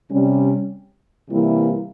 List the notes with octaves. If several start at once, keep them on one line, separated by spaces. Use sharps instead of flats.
C3 G3 C#4
C3 E3 G3 A#3 E4